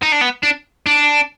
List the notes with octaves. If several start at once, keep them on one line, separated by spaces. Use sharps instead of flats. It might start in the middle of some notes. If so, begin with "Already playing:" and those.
D#4
D4
B3
D4
D4